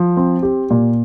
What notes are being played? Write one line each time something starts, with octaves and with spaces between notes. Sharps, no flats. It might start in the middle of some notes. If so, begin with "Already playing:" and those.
Already playing: F3
C4
G4
A#2